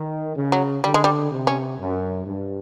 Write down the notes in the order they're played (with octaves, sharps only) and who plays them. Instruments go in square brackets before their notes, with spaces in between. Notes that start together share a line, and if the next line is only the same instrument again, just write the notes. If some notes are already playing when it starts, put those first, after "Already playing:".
Already playing: [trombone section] D#3
C#3
[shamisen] F#3
[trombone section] D3 [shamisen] G3
[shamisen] G#3
G3
[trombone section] C3
[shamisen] C#4
[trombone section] F#2
G2